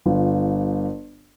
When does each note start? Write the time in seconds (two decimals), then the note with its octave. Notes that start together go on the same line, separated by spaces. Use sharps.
0.06 G1 F4